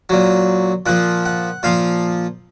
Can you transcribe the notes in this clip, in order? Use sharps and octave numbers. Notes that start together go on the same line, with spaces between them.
A#2 F#3
A#2 F3 F#5
F#5
A#2 F3 F5